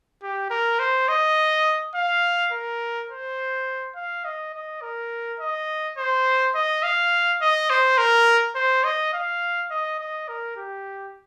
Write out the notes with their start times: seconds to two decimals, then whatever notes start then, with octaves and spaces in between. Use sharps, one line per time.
0.23 G4
0.50 A#4
0.79 C5
1.08 D#5
1.95 F5
2.52 A#4
3.09 C5
3.96 F5
4.25 D#5
4.54 D#5
4.82 A#4
5.40 D#5
5.98 C5
6.55 D#5
6.83 F5
7.41 D#5
7.70 C5
7.98 A#4
8.55 C5
8.84 D#5
9.14 F5
9.71 D#5
9.99 D#5
10.28 A#4
10.56 G4